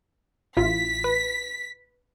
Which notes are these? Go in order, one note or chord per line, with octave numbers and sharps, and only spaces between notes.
A1 E4 F4 B6
B4